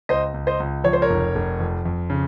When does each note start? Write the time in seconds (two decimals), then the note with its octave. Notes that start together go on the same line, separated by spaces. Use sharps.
0.09 C#2 C5 D#5
0.34 C#2
0.47 C5 D#5
0.60 C#2
0.84 F3 C#5
0.93 C5
1.02 A#4 C#5
1.10 F1
1.35 F1
1.60 F2
1.85 F2
2.10 C#3